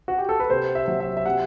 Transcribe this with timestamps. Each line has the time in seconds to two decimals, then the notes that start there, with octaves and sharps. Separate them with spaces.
0.08 F#4
0.18 G4
0.29 A4
0.40 B4
0.50 C3 C5
0.75 E5
0.88 F#3
1.00 E5
1.17 E5
1.25 C3 F#5